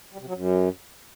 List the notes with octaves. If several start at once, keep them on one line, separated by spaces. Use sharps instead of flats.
G3
C3
F#3
F#2